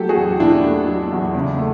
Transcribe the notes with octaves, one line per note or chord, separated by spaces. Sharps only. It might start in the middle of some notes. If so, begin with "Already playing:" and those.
Already playing: F#3 A3 G4 A4
F#4 G#4
E2
B2 D4 E4
A3
F#3
E2
C#3
A3